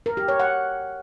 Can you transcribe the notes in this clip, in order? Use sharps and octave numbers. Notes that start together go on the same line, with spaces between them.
A#4
G4
C#5
F#5